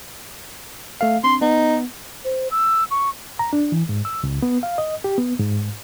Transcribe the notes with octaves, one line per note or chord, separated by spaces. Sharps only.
A3 A4 F5
C4 D4 C6
B3 D#4
C5
E6
C#6
A#5
D4
E3
G#2
E6
C#2
B3
F5
D#5
G4
B3
G#2